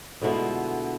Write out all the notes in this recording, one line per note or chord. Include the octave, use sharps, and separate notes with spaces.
B2 D3 G#3 A3 E4 F4